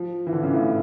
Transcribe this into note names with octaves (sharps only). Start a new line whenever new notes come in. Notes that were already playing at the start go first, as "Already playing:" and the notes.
Already playing: F3
E3
D3
C#3
A2